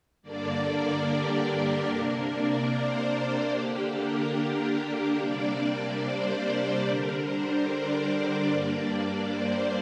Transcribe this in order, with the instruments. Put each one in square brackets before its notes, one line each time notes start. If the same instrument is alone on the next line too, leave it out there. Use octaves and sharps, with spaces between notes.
[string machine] G2 D3 A#3 D4 D5
A#4
G4
C3 A#3 D4 A#4
D5
C5
A#4
D3 A#3 D4 G4
A#4
G4
A#4
C3 G3 A#3 D4 D5
C5
G4
D3 G3 D4 A#4
C5
D5
G2 G3 A#3 D4
C5